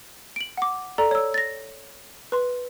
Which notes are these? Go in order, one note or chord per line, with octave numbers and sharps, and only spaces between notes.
D7 F#7
F#5 D6
A4 D5 A#5
C#5 E6
A6 A#6
B4 C6